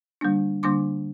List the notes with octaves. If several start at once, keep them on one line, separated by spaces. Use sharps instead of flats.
D3 G3 A#3 D4
D3 G3 A#3 D4 C6 D6